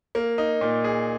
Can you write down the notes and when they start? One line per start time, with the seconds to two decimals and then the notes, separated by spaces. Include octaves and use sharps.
0.15 A#3
0.38 D#4
0.61 A#2
0.84 G#4